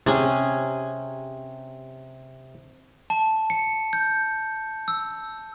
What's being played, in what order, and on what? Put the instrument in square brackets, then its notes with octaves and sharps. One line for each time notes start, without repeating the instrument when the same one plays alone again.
[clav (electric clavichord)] C3 [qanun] C#4 G#4
[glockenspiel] A5
C#7
G6
E6